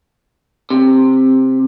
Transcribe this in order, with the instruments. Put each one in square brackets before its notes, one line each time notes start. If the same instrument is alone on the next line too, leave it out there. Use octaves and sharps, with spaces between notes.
[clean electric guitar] C3